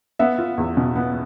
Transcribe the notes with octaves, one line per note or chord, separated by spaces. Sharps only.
B3 E5
F4
E2
B2
B3